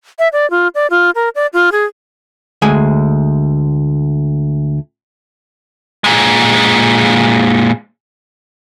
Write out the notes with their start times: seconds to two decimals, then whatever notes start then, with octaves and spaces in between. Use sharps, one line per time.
0.19 E5
0.33 D5
0.51 F4
0.75 D5
0.90 F4
1.15 A#4
1.35 D5
1.53 F4
1.72 G#4
2.62 D2 G#3 G#5
6.04 A#2 G#3